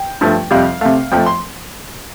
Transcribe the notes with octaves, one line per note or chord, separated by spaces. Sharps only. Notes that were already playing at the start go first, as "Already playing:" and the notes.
Already playing: G5
G2 F3 A3
F2 C3 G3 F5
C3 A3 F5
F2 F3 A3 G5
C6